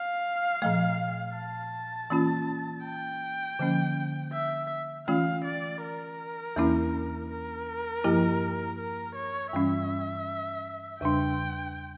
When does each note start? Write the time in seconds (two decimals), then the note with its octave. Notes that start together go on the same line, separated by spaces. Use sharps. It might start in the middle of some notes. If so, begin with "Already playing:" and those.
Already playing: F5
0.62 A#2 F3 A3
1.37 A5
2.10 E3 A#3 C#4 F4
2.85 G5
3.59 D3 F3 A#3 C#4
4.33 E5
5.07 E3 A3 C#4 F4 F5
5.45 D5
5.82 A#4
6.56 E2 E3 A#3 C#4 E4
7.30 A#4
8.04 G2 F3 A#3 E4 G4
8.79 A#4
9.16 C#5
9.53 G2 E3 G3 C#4 E5
11.01 E2 C#3 G3 D4 G5